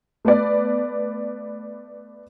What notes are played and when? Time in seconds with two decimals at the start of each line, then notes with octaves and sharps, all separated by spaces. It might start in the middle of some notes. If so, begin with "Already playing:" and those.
0.25 A3 B3 B4 D5